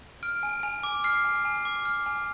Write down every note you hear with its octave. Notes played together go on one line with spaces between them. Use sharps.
F6 D7
G#5
G#5
D6
F6 C7
G#5
G#5
D6
F6
G#5